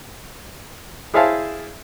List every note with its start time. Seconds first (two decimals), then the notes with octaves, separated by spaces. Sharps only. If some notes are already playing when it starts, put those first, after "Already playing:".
1.14 E4 G#4 C5 E5 F5 A5